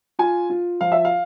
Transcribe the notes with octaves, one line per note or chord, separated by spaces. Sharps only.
F4 G#5
F4
F3 F5
E5
F5